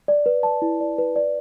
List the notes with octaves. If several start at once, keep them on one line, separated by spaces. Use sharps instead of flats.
D5
B4
A5
E4
D5
B4
D5